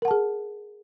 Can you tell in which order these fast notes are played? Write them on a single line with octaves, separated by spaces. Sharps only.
A#4 F#5 A5 G#4